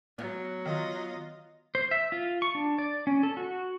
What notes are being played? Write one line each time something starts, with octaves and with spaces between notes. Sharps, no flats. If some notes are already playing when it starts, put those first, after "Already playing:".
F#3 B3
D#3 F4 D#5
C5
E5
F4
C#6
D4
D5
C#4
A4
F#4